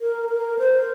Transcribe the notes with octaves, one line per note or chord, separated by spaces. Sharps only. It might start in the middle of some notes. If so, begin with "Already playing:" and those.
A#4
A#4
C5